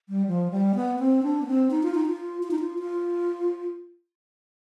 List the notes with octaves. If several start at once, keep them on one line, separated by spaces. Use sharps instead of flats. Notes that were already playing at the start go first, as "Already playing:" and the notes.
G3
F3
G3
B3
C4
D4
B3
C4
D#4
F4
D#4
F4
F4
D#4
F4
F4